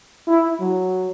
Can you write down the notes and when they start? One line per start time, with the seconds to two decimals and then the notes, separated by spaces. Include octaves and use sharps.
0.27 E4
0.60 F#3